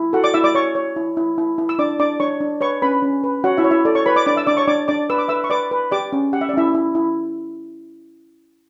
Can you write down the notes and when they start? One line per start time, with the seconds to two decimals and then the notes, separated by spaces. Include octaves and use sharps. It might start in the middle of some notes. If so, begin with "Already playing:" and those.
Already playing: E4
0.13 F#4 A4 F#5
0.24 D5 D6
0.34 E4 E5 E6
0.44 D5 D6
0.55 C#5 C#6
0.75 C#5
0.96 E4
1.17 E4
1.38 E4
1.58 E4
1.69 E6
1.79 D4 D5 D6
1.99 D4 D5 D6
2.20 D4 C#5 C#6
2.40 D4
2.61 B4 C#5 C#6
2.82 C#4 B4 B5
3.02 C#4
3.24 B4
3.44 F#4 C#5 F#5
3.57 E4 E5
3.64 C#5
3.71 E4 E5
3.85 A4 D5
3.95 C#5 C#6
4.06 B4 C#5 B5
4.16 D5 D6
4.26 D4 D5 D6
4.36 E5 E6
4.47 D4 D5 D6
4.57 C#5 C#6
4.68 D4 D5 D6
4.88 D4 D5 D6
5.10 B4 E6
5.18 D6
5.28 B4 E5 E6
5.44 C#6
5.50 B4 D5 D6
5.71 B4
5.91 G4 D5 D6
6.13 C#4
6.33 G4 F#5
6.41 E5
6.49 D5
6.53 C#4 E4 E5
6.75 E4
6.95 E4